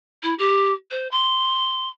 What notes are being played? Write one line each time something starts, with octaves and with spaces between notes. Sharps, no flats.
E4
G4
C5
C6